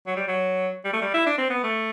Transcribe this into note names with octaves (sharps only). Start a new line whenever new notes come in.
F#3
G3
F#3
G3
A3
G3
E4
D4
C4
B3
A3